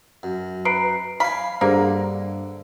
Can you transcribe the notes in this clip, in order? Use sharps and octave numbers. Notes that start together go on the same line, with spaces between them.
F#2
B4 A#5 C7 D7
F5 G#5 B5
G2 D3 A#3 G#4 C5